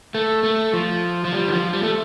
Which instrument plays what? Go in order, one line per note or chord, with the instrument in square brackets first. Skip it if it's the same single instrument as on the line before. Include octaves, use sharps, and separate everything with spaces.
[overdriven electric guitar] A3
A3
F3
F3
G3
D#3
F3
G3
A3